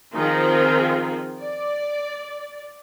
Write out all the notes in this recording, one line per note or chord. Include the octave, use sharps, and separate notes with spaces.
D#3 F3 C4 D#4 F4 G#4
D5